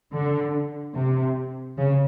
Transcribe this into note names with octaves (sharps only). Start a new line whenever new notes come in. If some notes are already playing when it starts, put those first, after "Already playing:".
D3
C3
C#3